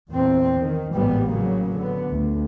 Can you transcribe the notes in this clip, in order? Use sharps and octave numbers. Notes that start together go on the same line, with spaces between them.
E2 A#2 C4
D#3
A1 G#2 G3 B3
C#3 F#3 A#3
D3 B3
D2